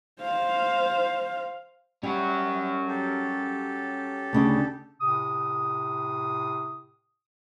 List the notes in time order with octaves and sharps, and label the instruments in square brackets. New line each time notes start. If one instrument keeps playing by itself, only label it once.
[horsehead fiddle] C5 F5
[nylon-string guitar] G3 [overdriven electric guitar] C#4 F#4 [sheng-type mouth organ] E5
[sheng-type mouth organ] G4 A4
[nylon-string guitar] D2 C#3 D4
[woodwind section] A2 C3 D#6